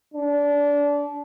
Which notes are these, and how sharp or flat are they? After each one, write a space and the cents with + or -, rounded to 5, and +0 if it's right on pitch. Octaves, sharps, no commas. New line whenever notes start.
D4 -25